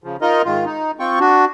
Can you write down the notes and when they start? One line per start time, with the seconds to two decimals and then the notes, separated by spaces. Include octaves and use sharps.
0.04 C#3 F3
0.21 D#4 F4 A#4 D#5
0.45 G#2 D#3 F4
0.65 D#4
1.00 C4 F4 G5 C#6
1.20 D4 F#4